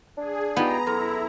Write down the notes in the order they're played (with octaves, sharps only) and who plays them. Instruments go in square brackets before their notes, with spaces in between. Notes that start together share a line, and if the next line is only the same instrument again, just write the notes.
[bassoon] D4 [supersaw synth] G#4
[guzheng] B3 [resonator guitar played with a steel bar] D#4 F4 G4 [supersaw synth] A#5
[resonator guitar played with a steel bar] F#2 [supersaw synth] E4 [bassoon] A4